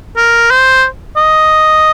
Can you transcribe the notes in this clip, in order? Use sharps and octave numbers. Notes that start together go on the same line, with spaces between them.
A#4
C5
D#5